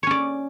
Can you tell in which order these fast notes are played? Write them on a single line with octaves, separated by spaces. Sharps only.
C#5 C#4 D5